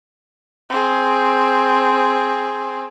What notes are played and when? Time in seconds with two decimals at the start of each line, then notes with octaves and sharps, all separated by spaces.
0.70 C4 G#4